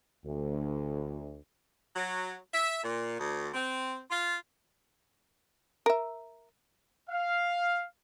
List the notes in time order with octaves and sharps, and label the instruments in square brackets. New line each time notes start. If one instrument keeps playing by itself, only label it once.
[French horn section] D2
[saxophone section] F#3
E5
A#2
D2
C4
F4
[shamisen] A#4 E5
[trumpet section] F5